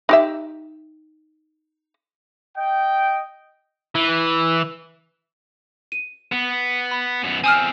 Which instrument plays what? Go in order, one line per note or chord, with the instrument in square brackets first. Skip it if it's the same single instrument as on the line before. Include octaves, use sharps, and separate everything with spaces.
[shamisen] D#4 G4 E5
[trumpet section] D#5 G5
[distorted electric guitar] E3
[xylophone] D#7
[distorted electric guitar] B3
[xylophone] B5
[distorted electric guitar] F#2 B3
[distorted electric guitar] E2 C4 [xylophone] G#5 D#6 F6